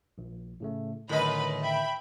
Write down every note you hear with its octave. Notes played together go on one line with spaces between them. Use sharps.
A#1
A2 C#3 A3
F#2 A2 D3 D#3 B4 D#5 B5
E5 G5 B5